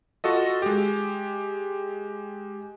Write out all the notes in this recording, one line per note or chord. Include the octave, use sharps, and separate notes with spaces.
F4 F#4 A4 D#5
G#3 G4